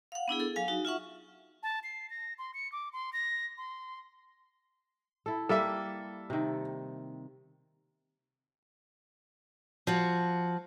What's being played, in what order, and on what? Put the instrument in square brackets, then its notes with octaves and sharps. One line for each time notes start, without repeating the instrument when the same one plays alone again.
[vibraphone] F5 F#5
B3 D4 E4 G#4
G#4 A4
F#3 F5 G#5
D#4 F#4
F4 E5 F#5 C#6
[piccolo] A5
C7
A#6
C6
C#7
D6
C6
A#6
C6
[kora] E4 A4
[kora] G3 A#3 [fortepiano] A4 E5
[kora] C3 D#3
[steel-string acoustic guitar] F3 F#4